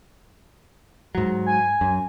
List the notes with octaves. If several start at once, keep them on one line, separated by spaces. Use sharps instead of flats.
G#2 F#3
G#5
F#2